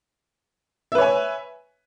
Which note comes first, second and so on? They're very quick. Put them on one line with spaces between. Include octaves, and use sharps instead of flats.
E5 B4 C#5 G#5